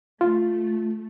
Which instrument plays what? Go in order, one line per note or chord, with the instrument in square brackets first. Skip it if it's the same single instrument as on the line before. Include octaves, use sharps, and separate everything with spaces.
[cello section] A3 [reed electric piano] F4